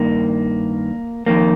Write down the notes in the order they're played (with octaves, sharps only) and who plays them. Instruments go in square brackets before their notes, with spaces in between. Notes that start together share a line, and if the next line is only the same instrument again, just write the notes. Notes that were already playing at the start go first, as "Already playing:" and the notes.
Already playing: [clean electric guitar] G2 D#3 A#3
F2 D#3 A#3